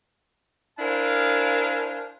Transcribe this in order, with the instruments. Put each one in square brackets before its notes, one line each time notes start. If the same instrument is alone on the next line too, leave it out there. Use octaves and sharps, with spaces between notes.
[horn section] D4 E4 A#4 C5 F5 G#5